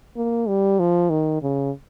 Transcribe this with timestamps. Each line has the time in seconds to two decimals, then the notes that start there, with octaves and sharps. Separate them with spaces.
0.16 A#3
0.48 G3
0.79 F3
1.10 D#3
1.42 C#3